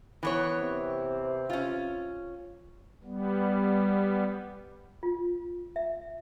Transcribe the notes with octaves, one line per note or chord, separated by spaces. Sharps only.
E3 B3 C#5
C3 C4
C#4 F4
G3 B3
F4
E5